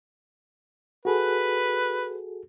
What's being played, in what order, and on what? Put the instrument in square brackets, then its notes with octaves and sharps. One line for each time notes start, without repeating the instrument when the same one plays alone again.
[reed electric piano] F#4 G#4 A4 [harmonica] B4